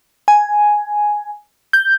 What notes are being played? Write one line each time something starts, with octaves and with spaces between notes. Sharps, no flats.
G#5
G6